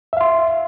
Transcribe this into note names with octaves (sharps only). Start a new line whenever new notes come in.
E5 F5 C6